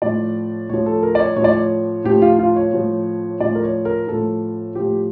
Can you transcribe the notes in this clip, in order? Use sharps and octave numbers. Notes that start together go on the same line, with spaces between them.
A2 F3 D5
A2 F3 C#5
A4
A#4
D5
C#5
A2 F3 C#5
D5
C#5
A2 F3 G4
F4
F4
C#5
A2 F3
A2 F3 D5
A#4
C#5
A#4
A2 F3 A4
A2 F3 G4